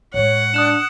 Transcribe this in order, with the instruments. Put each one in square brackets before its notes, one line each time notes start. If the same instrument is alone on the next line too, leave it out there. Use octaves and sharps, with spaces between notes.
[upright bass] A2 G#3 [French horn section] C#5 [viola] F#5
[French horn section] D4 [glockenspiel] D#6 F#6 E7